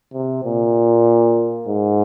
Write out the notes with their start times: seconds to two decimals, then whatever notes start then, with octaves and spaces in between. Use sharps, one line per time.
0.14 C3
0.45 A#2
1.68 G#2